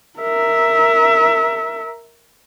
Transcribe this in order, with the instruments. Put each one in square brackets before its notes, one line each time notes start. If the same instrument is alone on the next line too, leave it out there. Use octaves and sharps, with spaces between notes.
[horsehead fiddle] A#4 E5